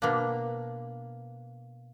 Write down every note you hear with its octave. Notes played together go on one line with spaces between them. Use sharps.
B2 A#3 D4 F5